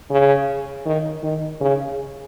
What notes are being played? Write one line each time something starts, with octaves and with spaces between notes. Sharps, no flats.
C#3
D#3
D#3
C#3